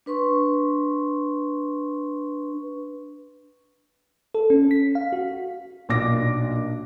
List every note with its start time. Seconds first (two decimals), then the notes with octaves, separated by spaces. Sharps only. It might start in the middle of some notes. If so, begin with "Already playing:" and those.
0.06 D4 B4 C6 C#6
4.35 A4
4.50 C#4
4.71 B6
4.95 F5
5.13 F#4
5.89 B1 A#2 D4 D6 A#6